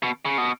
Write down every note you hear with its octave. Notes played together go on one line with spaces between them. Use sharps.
B2
C#3
B2